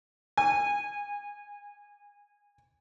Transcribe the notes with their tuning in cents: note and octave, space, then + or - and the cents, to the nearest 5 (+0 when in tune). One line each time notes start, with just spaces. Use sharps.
G#5 -25